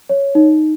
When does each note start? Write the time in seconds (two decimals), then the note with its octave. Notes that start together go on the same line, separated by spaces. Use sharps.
0.09 C#5
0.35 D#4